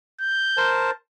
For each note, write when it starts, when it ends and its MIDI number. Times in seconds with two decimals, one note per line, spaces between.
0.20 0.73 91
0.57 0.91 70
0.57 0.91 72
0.57 0.91 81